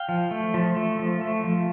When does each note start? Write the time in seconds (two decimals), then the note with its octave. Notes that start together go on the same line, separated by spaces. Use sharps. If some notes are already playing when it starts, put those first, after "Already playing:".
Already playing: F5 G5
0.09 F3
0.31 A3
0.54 F3
0.77 A3
0.99 F3
1.21 A3
1.44 F3